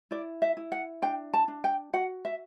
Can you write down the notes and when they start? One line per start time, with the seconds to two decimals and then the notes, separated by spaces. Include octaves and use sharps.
0.11 E4 D5
0.42 E5
0.57 E4
0.72 F#5
1.02 D4 G5
1.34 A5
1.48 D4
1.64 G5
1.93 F#4 F#5
2.25 E5